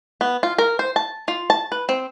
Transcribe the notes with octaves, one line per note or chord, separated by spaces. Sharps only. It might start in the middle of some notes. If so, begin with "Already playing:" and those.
B3
F4
A#4
C5
A5
F4
A5
B4
C4